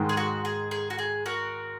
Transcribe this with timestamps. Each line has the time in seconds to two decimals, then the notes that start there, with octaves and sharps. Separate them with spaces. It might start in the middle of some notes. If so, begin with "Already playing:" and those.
Already playing: G#2 D#3 G#3
0.09 G#4
0.17 F#4
0.45 G#4
0.71 G#4
0.90 F#4
0.99 G#4
1.26 F#4 A#4